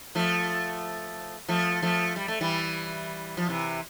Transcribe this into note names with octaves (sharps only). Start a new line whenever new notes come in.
F3 A3
F3 A3
F3 A3
G3
A3
E3 G3
F3
C3 E3